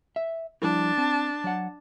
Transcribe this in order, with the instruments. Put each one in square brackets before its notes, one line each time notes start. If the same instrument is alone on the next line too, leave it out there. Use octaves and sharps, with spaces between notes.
[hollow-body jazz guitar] E5
[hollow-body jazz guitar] F3 G3 E4 [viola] D4 A5
[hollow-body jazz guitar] C4
F#3 F#5